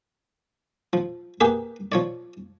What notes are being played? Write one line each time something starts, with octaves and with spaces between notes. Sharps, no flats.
F3
A#3 G4 G#4 B4
F3 C#5 D5